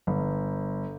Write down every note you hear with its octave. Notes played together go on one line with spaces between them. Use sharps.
G1